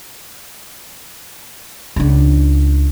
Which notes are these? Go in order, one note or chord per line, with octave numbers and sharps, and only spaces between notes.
C#2 D4